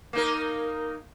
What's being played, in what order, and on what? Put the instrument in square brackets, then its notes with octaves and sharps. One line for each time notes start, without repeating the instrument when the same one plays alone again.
[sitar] A#3 D#4 A#4